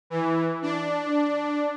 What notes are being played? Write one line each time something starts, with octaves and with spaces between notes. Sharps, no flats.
E3
D4